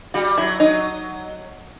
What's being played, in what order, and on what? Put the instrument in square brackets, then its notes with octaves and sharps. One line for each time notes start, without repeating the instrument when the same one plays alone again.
[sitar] G3 [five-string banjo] F#4
[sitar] F#3 [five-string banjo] E4
[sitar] F#3 [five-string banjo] D#4